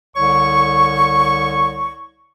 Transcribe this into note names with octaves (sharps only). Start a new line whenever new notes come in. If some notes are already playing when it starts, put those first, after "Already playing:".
C2 D3 C#5 C#6